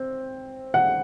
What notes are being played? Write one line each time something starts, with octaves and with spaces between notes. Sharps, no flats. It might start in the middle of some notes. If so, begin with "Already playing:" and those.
Already playing: C4
F#5